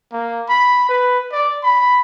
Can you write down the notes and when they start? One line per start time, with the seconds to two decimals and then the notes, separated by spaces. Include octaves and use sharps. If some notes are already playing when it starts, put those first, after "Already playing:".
0.12 A#3
0.49 B5
0.89 B4
1.32 D5
1.63 B5